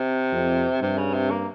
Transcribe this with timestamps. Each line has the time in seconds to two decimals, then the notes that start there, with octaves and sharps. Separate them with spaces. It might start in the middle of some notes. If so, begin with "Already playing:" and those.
Already playing: C3
0.32 F2
0.81 G2 C3
0.98 C#3
1.14 C3
1.30 A#3